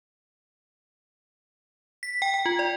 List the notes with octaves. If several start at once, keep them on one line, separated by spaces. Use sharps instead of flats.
B6
G5
G5
F4
D5